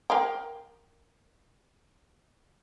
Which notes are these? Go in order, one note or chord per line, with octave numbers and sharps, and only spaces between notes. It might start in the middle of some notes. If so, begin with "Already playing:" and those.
A#4 F5 G5